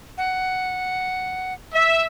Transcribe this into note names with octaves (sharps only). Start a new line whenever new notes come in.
F#5
E5